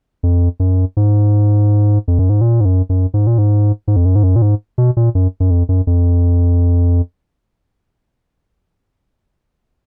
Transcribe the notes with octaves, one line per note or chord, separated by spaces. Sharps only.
F2
F#2
G#2
F2
F#2
G#2
A#2
G#2
F#2
F#2
G#2
A#2
G#2
G#2
F2
F#2
G#2
F#2
A#2
G#2
B2
A#2
F#2
F#2
F2
F#2
F2